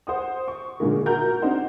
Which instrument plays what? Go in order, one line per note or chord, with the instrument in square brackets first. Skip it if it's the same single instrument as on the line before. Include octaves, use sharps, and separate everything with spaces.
[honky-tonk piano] C5 F#5 D#6
C#6
A#2 D3 D#3 G#3 A#3
F#4 A#4 A#5 G6
C4 D4 D#4 C5 F#5